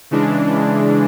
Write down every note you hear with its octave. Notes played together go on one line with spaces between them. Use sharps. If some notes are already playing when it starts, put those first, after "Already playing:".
C#3 E3 G#3 D4